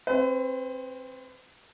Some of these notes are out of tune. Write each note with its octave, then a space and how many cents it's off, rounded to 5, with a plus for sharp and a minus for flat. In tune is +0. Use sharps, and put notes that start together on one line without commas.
C4 +20 B4 +40